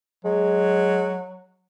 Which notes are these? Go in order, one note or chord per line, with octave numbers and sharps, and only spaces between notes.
F#3 G#3